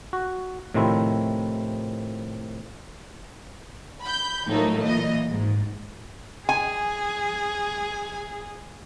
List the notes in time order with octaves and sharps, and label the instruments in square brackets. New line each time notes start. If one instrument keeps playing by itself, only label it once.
[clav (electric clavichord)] F#4
A2 C3 D#3 F3 C4 E4
[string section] B5 G6
A2 F3 F#3 A3 A#3 D#4
A#2 E3 D#5
G#1 G#2
[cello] G#4 [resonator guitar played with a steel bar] G#5